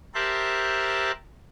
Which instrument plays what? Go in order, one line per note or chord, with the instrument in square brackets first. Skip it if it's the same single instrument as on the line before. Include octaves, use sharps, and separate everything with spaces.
[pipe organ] G4 A#4 C5 E5 A5 F#6